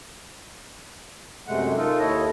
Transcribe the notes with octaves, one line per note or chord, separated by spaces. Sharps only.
F#2 C3 G#3 A3 F#5
D#4 F4 A4 A#4
D#2 E4 A4 C#5 D#5